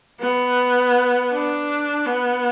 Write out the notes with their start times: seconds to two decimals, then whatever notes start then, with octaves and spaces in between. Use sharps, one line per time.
0.21 B3
1.32 D4
2.06 B3